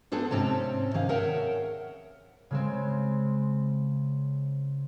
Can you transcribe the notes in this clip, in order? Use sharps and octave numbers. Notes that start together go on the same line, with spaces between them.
B3 D4 G#4 A4 C5
G#2 C3 C4 C#4 A5
D#3 G#4 F5
G#4 A#4 C#5 E5 F#5 G5
C#3 G#3 C4